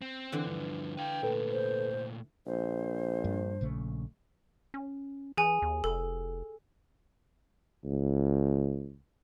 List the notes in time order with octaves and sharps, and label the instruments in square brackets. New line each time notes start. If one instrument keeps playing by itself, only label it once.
[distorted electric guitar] C4
[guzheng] D3 E3
[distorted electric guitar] G2 F3
[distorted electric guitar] B4 F5 [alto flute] G5
[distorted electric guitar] A#2 A3 [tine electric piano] A4 B4
[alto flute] C5
[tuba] A#1 [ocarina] C5
[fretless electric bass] G2
A#1 C#3 A3
[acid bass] C#4
[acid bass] E3 [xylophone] G#4 G#5
[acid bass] D#2
[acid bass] F1 [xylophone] A4
[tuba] C#2